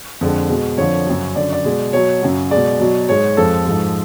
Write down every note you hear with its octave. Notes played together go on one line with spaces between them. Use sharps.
F2 D3 G#3
B2 G#3
F2 D3 F3 C#5
F#2 C#3 F#3
F#2 D3 F#3 D5
D5
B2 G#3
B2 F#3 C#5
F#2 C#3 F#3
B2 G#3 D5
B2 F#3
G#2 G#3 C#5
F2 F3 G#3 A4
G#2 F3 G#3